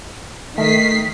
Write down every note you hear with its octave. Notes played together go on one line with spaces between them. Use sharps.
D#3 A3 B6 C7